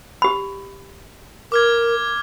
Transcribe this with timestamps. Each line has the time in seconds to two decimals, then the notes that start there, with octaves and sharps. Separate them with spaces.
0.22 G4 B5
1.52 A#4 D6 F6 G#6